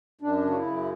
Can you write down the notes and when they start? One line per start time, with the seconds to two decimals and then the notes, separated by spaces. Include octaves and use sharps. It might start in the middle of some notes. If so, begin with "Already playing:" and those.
0.21 F#2 D4
0.44 C#3
0.51 F#4
0.55 E4
0.66 F#2